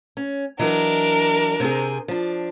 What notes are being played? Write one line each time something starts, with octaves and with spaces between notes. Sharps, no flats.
C#4
E3 F#3 D4 A#4 D#5
C3 C4 G#4
F3 D4